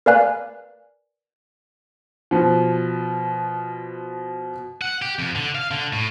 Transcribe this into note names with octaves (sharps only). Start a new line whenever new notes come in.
A#4 B4 D5 F5 G#5 F#6
B2 F3
F#5
G4
F2
D3
F5
D3
A2